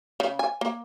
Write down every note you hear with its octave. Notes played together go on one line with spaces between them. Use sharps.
C#3
G#5
A#3